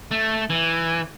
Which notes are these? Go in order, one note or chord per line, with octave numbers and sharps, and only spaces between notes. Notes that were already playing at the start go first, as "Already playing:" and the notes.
A3
E3